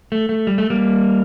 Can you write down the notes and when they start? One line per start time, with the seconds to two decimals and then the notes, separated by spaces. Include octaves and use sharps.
0.12 A3
0.29 A3
0.47 G3
0.58 A3
0.70 G3 A#3